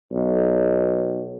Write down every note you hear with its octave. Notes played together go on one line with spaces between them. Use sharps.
B1